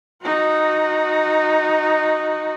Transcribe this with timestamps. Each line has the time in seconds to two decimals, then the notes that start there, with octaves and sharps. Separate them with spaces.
0.22 D#4 F#4